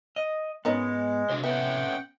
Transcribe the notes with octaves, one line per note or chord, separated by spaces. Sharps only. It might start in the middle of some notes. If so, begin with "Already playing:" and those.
D#5
G#2 D#3 G#3 B3 C#4 D#4
C2 D4 F#4 C5
B3 C#4 B4 E5 F#5 G5